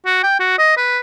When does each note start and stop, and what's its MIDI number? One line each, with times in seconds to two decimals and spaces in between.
0.06 0.20 66
0.23 0.38 79
0.40 0.54 66
0.58 0.76 75
0.77 1.00 71